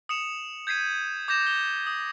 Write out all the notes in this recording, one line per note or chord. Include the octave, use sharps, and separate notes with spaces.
D#6 C#7 E7 F7
G6 G#6 B6 C7 D#7
D6 G6 A#6 E7
G7
D#6